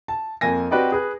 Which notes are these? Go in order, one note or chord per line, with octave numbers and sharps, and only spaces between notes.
A5
F2 A#3 G#5 A#6
C4 F#4 G4 B4 D5 D#5
G#4 B4